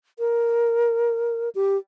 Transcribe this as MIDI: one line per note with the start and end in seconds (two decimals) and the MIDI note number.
0.19 1.49 70
1.55 1.77 67